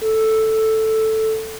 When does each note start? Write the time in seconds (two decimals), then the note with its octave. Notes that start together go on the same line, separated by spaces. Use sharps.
0.02 A4